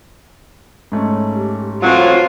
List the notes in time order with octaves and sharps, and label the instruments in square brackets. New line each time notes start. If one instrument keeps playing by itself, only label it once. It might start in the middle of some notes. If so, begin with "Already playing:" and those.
[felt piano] G#2 A3 C#4
[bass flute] G4
[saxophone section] A2 E3 F#3 [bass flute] C4 [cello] F4